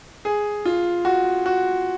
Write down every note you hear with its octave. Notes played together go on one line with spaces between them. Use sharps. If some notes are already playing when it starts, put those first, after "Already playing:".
G#4
F4
F#4
F#4